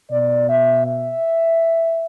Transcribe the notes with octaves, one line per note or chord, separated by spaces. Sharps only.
B2 D5
E5
E5